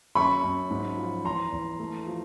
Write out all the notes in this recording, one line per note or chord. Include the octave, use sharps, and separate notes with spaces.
F#2 B5 C#6
F#2
G#2
F3
E2 A#5 C6
E2
A3
F3